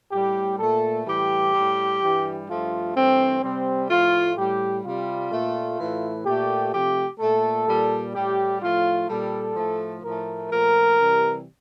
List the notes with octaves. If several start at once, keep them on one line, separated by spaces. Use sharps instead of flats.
A2 G3 G4
A#2 A3 A4
A2 E3 G3 G4
A2 G3
G2 E3 G3
G2 F3 A3 F4
G2 E3 A3 C4
C3 G3 C4
A2 F3 A3 F4
A2 G3 G4
C3 G3 F4
A#2 A3
A2 E3 A3
A#2 A3 G4
C3 F3 A3 G4
A#2 A3 A4
A#2 G3
A2 G3 G4
A2 F3 A3 F4
A#2 G3 A4
A2 F3 A3
A2 F3 A3 A#4
A#2 F3 A3 A#4
C3 E3 G3